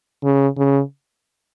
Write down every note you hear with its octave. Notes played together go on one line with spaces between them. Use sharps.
C#3
C#3